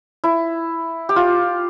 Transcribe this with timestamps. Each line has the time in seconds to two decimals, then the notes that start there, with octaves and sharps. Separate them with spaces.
0.24 E4
1.09 G4
1.16 F4